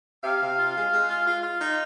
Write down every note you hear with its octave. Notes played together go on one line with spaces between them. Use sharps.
C3 F5
C3
F4
G#3
G#3
F4
F4
F4
D#4